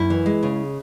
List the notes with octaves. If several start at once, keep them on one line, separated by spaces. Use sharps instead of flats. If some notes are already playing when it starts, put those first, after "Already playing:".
Already playing: F#2 E4
E3
G#3
C#3